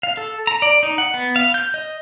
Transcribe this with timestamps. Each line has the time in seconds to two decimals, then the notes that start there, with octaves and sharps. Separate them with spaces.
0.03 F5
0.17 A4
0.47 A#5
0.62 D5
0.83 D#4
0.98 F#5
1.14 B3
1.36 F5
1.54 G6
1.74 D#5